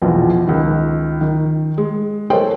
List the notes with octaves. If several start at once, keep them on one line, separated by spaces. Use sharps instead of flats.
A#1 E2 B2 F3
C#2 D#3
D#3
G#3
A4 A#4 C5 C#5 D#5 G5